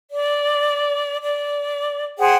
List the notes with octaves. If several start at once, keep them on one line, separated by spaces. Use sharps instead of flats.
D5
D5
G#4 C5 F#5 G5